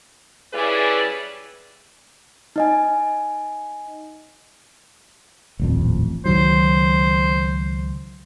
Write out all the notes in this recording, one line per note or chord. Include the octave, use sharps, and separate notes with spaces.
G3 C#4 E4 G#4 B4 D5
D#4 D#5 G#5
D#1 A1 F2
C#2 D#3 F#3 C5